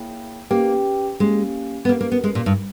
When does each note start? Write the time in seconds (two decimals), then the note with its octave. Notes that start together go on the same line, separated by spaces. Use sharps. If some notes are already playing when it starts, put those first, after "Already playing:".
Already playing: A#3 E4 G#4 C#5 G5
0.51 A#3 C#4 G4 B4 G5
1.20 G#3 A#3 C#4 G4
1.85 B3
1.89 A#3 C#4 G4 A#4
2.01 A#3
2.12 B3
2.24 G#3
2.35 A#2
2.46 G2